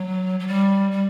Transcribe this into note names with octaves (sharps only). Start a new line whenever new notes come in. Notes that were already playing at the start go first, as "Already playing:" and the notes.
Already playing: F#3
F#3
G3
G3